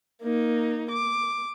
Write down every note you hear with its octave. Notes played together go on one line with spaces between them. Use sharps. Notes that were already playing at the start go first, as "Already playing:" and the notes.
A#3 D#4
D6